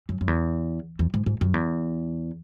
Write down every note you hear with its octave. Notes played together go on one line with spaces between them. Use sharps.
F#2
F#2
E2
E2
G#2
G#2
F#2
E2